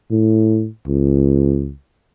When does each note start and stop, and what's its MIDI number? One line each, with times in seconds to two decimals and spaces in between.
0.11 0.68 45
0.88 1.72 37